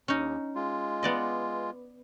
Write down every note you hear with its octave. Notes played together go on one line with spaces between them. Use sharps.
D#2 C#4 D#4
G#3 F4
B3 D5 D#5